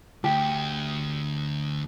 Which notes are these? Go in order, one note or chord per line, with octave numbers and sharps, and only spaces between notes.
D2 G4